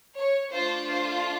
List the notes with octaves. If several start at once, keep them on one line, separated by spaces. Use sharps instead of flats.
C#5
A3 D4 F4 C5
C5